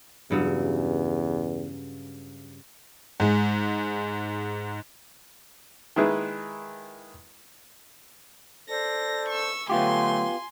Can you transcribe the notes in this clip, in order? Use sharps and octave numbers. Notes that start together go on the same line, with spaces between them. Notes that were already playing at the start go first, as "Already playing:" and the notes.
E2 G2 C#3 F#3
G#2 G#3
D#3 G#3 A#3 E4 G#4 B4
A4 C5 D5 A#6
C#6 E6
D3 F#3 A3 B3 F4 G4 G#5 C6